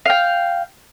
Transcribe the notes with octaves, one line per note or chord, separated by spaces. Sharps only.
F5 G5